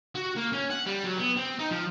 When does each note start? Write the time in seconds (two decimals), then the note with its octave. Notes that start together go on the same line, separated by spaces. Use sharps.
0.15 F#4
0.36 A#3
0.52 C#4
0.70 F#5
0.86 G3
1.05 F#3
1.17 B3
1.36 C4
1.59 D#4
1.71 F3